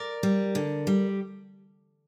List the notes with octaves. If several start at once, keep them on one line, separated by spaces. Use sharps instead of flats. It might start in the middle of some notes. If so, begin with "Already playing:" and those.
Already playing: A#4 D5
G3
D3
G3